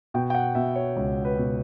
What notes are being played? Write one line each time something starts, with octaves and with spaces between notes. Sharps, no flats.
B2 G5
G5
F#5
B2 E5
C#5
C#2 C#5
B4
B2